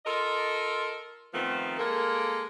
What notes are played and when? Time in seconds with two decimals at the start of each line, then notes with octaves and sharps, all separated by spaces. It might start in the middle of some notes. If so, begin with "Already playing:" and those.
0.05 F4 A4 A#4 D#5
1.33 D#3 F3 A3 B3 C4
1.78 G#3 A#3 A4 A#4